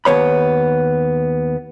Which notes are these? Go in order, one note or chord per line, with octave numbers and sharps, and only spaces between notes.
D#2 B3 C#5 B5